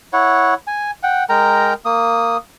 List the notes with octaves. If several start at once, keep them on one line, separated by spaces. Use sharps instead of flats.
E4 C#5 F#5
G#5
F#5 G5
G#3 A#4 G5 A#5
A#3 D#6